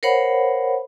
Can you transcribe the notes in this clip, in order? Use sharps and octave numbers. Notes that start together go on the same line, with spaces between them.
A#4 C5 C#5 F5 F#5 B5